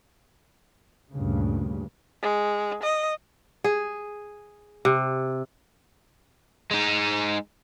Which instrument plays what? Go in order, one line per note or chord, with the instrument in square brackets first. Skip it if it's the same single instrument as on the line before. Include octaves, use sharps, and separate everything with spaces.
[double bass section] D2 G2 A#2 C#3
[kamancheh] G#3
D#5
[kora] G#4
C3
[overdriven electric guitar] G#3 D#4